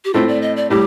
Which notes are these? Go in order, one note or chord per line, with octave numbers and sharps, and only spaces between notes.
G4
A2 A3 C4 F4
D5
D#5
D5
A2 G3 G4